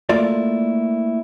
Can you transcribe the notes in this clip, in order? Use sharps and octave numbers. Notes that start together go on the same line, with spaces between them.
A3 A#3 E4 F4 D5